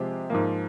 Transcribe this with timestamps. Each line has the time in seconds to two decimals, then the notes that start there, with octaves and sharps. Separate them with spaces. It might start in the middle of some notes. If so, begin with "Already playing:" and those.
Already playing: C3 F3 G#3 C4 G4
0.30 G#2 F3 A#3